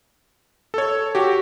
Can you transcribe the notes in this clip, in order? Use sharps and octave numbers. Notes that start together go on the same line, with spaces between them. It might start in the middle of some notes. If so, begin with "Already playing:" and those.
A4 C#5
F#4 G4